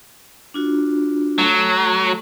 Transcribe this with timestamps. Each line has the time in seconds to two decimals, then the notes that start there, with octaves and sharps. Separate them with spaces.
0.54 D4 F4 F#4
1.39 F#3 A3 A4 A5